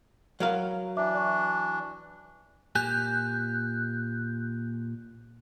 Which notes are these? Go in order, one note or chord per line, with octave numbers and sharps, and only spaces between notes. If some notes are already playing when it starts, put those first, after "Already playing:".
F#3 A#4 F5
E3 D4 E5 D6
D5 C#6
A#2 G4 G#5 F#6 G6